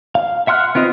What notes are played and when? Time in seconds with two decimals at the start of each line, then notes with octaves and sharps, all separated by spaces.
0.15 F5
0.47 E5 F#5 C6 F6 F#6
0.75 B3 C4 F4 D#5